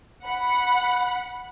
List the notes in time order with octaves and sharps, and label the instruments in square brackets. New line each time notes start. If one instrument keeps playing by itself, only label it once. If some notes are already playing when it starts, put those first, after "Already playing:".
[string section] F#5 B5